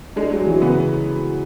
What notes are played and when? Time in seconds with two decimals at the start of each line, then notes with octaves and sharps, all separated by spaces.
0.16 G#3 D4
0.31 F#3 G#3
0.46 E3 F#3
0.62 C#3 B3